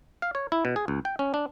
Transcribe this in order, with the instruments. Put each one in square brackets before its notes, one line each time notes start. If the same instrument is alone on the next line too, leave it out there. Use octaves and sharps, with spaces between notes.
[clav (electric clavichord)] F5
C#5
E4
B2
G#4
C#2
G5
C#4
D4